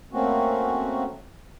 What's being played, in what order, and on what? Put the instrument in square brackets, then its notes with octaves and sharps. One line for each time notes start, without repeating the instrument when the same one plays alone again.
[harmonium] A3 A#3 C4 C#4 F#4